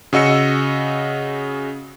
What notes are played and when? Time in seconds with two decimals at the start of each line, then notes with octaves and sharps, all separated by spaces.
0.13 C#3 F#4 D#5 E6 C#7